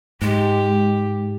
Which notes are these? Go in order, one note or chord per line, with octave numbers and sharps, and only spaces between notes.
G#2 G#3 G4